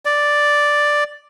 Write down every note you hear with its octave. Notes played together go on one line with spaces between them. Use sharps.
D5